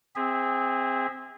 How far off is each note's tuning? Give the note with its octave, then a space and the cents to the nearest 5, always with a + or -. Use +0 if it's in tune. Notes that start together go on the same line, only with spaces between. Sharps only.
C4 +0 G#4 -25 E5 -25